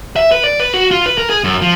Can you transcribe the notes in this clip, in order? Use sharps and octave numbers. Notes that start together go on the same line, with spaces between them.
E5
B4
D5
B4
F#4
F4
B4
A#4
G#4
F#2
F3